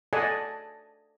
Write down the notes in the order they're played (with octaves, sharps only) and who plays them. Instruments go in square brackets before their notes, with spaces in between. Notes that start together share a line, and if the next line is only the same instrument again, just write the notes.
[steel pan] A4 D5 D#5 F#5 G#5 A5